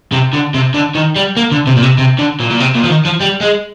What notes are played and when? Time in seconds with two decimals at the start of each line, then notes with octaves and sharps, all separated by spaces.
0.12 C3
0.33 D3
0.54 C3
0.74 D3
0.95 D#3
1.16 G3
1.37 A#3
1.52 D3
1.67 C3
1.76 A#2
1.82 C3
1.98 C3
2.18 D3
2.40 A#2
2.50 A#2
2.60 C3
2.75 A#2
2.84 F3
2.90 D#3
3.06 F3
3.22 G3
3.42 G#3